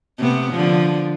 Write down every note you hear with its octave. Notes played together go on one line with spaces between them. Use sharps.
C3 A3 B3
D3 F3